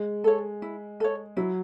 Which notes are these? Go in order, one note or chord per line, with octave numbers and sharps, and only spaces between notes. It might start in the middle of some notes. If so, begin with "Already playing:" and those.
Already playing: G#3
A4 C#5
E4
A4 C#5
F#3 E4